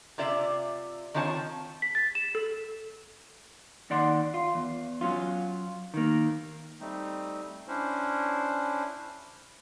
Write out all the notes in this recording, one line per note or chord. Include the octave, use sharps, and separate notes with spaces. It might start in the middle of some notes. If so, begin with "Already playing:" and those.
C3 F4 D5 E5
D#3 C4 D4 F4 C#5 A5
B6
A6
E7
A4
D#2 D#3 D5 F#5 C6
F4
E2
F#3 C#4 F4
D#3 A#3
G3 A3 C4 D#4
C#4 D4 E4 C5